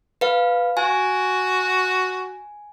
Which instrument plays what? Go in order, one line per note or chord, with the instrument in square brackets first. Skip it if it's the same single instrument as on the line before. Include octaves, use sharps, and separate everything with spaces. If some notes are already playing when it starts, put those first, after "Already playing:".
[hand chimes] B4 F5
[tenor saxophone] F#4 [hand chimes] G#5